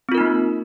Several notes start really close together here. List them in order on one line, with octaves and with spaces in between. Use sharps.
C4 F4 A#4 D#4 A#3